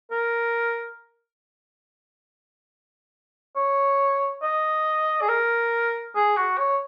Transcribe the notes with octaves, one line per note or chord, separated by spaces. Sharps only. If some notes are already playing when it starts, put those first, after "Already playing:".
A#4
C#5
D#5
G#4
A#4
G#4
F#4
C#5